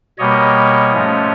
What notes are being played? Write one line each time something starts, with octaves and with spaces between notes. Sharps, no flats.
B2 G3 A#3 C#5 D#5
G#2 F3 A3 C#4